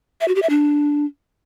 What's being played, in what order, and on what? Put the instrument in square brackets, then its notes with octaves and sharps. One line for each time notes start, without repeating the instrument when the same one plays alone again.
[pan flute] E5
F#4
G4
E5
D4